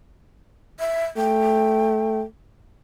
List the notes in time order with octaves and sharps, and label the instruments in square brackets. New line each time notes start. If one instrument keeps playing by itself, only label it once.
[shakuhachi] E5
[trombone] A3 [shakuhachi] G5